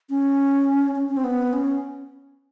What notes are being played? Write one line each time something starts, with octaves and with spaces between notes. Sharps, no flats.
C#4
C#4
C#4
C4
B3
C#4